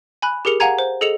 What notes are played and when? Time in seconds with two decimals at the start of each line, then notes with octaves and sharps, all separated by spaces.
0.22 G#5 B5 F#6
0.45 G4 G#4 A#4 C#7 F7
0.60 F5 F#5 G#5 A#5 G#6
0.79 C5
1.01 G#4 A4 D#5 C#7 E7 F7